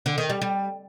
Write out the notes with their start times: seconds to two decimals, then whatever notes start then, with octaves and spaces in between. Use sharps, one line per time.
0.06 D3
0.18 D#3
0.30 G3
0.42 G3